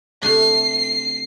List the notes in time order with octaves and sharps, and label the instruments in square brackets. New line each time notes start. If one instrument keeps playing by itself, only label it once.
[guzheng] C3 A3 D4 [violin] C7